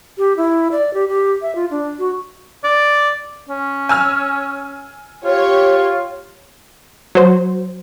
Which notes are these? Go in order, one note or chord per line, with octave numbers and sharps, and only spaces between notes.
G4
E4
D5
G4
G4
E5
F4
D4
F#4
D5
C#4
G#5 E6 F6
F4 G4 C#5
F#3 C5